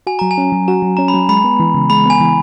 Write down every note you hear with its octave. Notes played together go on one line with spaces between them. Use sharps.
F#4 G#5
F#3 A#5
G#5
C#4
F#3
F#4 A#5
F#3
C#4 A#5
B5
F#3
G#3 B5
B3
E3
C#3
G#3 B5
B3 G#5
E3